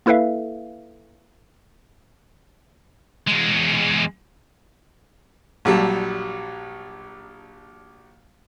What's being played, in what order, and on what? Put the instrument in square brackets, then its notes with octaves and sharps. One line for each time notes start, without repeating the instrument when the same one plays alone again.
[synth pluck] A#3 E4 A4 B4 E5 F5
[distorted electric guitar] E2 G#3
[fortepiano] A#1 F#3 G3 A5